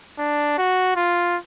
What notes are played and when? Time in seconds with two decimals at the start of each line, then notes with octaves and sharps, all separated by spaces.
0.18 D4
0.58 F#4
0.96 F4